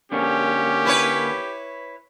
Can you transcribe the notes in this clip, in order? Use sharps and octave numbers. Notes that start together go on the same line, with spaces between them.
D3 A#3 C#4 D4 G4
E4 B4 C#5